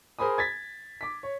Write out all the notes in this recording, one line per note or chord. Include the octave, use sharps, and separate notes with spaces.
G#4 A#4 C5 G#5 B5 D#6
G#6 A6 B6
D6 B6
C#5